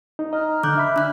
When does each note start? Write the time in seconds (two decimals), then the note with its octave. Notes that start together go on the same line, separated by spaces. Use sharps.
0.19 D#4
0.33 D#5 A#5 F6
0.63 D3 D6 F#6 G6
0.77 E5 B5
0.96 D4 F#6